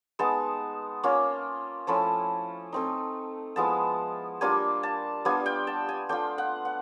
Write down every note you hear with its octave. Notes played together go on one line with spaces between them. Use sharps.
G#3 B3 D#4 A5
A#3 C#4 F4
F3 A3 C#4 E4 A5
A3 C4 D#4
F3 G#3 B3 E4 A5
G3 A#3 D4 F4 G#5
A5
G3 B3 D4 F4 G#5
G5
A5
G#5
A3 D4 F4 G5
F#5
F#5